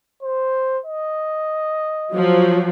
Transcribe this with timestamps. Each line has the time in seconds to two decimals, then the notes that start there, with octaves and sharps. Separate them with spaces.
0.23 C5
0.86 D#5
2.12 F3 F#3